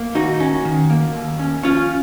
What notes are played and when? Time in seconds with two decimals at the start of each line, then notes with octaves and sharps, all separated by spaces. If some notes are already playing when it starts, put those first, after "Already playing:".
Already playing: A#3
0.15 D#2 D#4 F#4
0.40 C#4
0.65 D#3
0.90 A#3
1.15 D#2
1.39 C#4
1.63 F3 C#4 F4